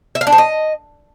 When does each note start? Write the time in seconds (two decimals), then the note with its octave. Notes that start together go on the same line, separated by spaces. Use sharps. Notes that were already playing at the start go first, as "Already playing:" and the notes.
0.15 E5
0.21 F5
0.27 D4
0.32 C5
0.38 D#5